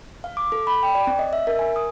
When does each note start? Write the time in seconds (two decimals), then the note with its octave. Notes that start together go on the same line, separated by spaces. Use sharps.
0.24 F5
0.37 D6
0.52 A4
0.67 B5
0.83 G5
0.95 D5
1.07 C4
1.19 D#5
1.33 E5
1.47 A#4
1.59 G#5
1.76 D#6